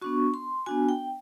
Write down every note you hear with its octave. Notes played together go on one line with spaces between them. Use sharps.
B3 D4 F#4 C#6
C6
B3 D4 F#4 G#5
G5